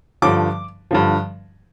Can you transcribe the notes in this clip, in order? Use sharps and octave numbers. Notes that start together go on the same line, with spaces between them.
G2 D3 F3 D6
G2 D3 F3